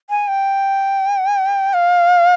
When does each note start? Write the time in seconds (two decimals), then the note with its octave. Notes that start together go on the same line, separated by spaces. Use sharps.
0.10 G#5
0.28 G5
1.74 F5